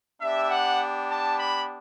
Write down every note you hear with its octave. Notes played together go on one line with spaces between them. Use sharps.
B3 D4 G4 E5
F#5
A5
B5